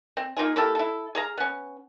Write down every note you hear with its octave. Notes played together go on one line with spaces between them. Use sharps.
C4
A#3 D#4 F4 G#4
A#3 E4 G4 A4
E4 A4
G#4 F5 A#5
B3 C#4